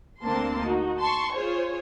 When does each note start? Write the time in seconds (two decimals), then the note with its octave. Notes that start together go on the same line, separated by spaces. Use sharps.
0.23 D2 A#3 C4 D4 A5 C6
0.61 D#4 F#4
0.99 A5 C6 C#6
1.34 F4 G#4 C5 C#5